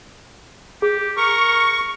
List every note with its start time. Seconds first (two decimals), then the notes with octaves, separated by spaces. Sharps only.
0.82 G4 G#4
1.17 A#4 C#6